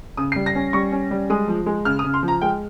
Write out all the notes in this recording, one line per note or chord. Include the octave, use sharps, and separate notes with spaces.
C#3 D#6
C7
G3
A#6
C#4
G3 C#6
C#4
G3
G#3 D#6
F3
G#3
C#3 F6
D#6
C#3
C6
F3
A#5
G#3 G5